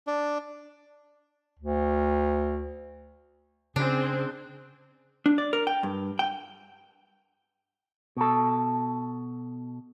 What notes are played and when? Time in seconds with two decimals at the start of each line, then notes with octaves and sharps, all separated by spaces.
0.07 D4
1.59 D2
3.76 C#3 C4 D4 G#4
5.26 D4
5.38 D5
5.53 A#4
5.67 G5
5.83 G2
6.19 G5
8.17 B2 A4